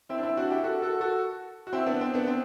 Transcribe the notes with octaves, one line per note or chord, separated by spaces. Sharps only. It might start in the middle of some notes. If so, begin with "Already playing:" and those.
C4 E4
D4
C4 E4
D4 F#4
E4 G4
F#4 A4
F#4 A4
F#4 A4
F#4
C4 E4
B3 D4
C4
B3 D4
C4